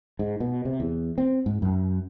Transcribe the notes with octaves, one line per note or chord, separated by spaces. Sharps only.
G#2
B2
C3
E2
C4
G#2
F#2